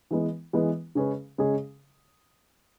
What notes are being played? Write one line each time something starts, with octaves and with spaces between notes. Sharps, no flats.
E3 G#3 B3
E3 G#3 B3
C#3 G#3 C#4 G#4 B4
C#3 G#3 C#4 G#4